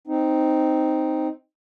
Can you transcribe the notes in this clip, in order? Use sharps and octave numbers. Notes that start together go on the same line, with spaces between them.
C4 D#4